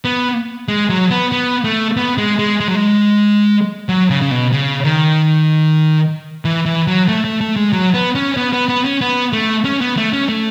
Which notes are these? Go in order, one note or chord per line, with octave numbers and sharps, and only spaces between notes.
B3
G#3
F#3
B3
B3
A3
B3
G#3
G#3
G#3
F#3
G#3
F#3
C#3
C#3
B2
C#3
D#3
E3
E3
F#3
A3
A3
A3
G#3
F#3
B3
C#4
B3
B3
B3
C#4
B3
A3
C#4
B3
A3
C#4
A3